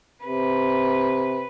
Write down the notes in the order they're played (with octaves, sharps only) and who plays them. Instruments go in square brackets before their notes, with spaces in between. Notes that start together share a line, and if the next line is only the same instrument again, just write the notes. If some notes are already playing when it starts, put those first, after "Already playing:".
[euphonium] C3 [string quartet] B4